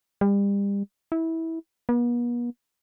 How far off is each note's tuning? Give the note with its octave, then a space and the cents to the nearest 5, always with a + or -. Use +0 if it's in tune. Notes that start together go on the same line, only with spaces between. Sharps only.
G3 +35
E4 -20
B3 -45